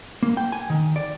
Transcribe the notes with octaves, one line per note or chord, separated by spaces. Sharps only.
A#3
G5
G#5
D#3
D5